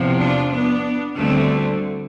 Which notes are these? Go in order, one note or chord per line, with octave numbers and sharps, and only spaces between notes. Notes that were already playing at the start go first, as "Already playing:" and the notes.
Already playing: E2 C3 F3
D4 F4
B3 D4
D2 D3 G3 A3 C4